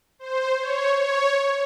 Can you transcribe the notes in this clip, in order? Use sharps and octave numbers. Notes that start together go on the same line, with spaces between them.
C5
C#5
C#5